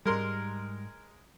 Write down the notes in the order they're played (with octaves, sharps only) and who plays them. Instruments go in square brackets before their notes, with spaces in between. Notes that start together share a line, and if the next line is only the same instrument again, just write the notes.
[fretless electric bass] G#2 G3 [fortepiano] G#3 A#4 C6